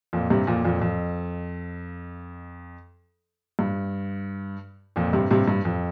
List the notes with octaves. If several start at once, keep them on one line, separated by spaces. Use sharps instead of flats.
F2 A#2
G2 C3
F2 A#2
F2 A#2
F2
G2
F2 A#2
G2 C3
G2 C3
G2
F2